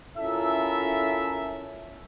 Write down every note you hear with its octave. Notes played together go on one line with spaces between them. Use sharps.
C#4 E4 F4 A4 A#4 E5